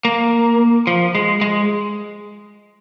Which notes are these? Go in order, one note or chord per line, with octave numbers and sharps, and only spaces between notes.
A#3
F3
G#3
G#3